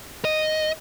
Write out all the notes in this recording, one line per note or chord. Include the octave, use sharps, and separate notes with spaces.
D#5